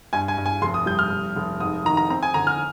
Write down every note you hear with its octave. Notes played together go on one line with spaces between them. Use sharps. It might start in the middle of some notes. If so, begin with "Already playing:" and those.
G2 G#5
G#5
G2
G#5
F1 C6
D#6
G3 G6
F6
F1
F1
G#2 D#6
D#3 A#5
A#5
C4 A#5
G#5
D3 A#5
F6